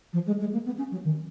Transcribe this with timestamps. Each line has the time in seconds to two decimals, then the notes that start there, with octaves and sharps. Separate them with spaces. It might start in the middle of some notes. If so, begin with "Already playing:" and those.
0.13 F3
0.26 G#3
0.40 G#3
0.52 A#3
0.65 B3
0.78 C#4
0.91 F#3
1.04 D#3